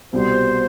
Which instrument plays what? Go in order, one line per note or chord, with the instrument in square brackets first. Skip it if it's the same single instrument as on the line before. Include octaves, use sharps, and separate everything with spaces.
[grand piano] C2 B2 G3 [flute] C5